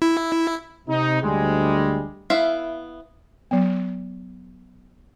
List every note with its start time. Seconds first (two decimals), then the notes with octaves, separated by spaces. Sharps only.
0.02 E4
0.88 C3 D#4
1.23 D2 G3 G#3
2.30 B3 E4 E5 F5
3.51 F#3 B3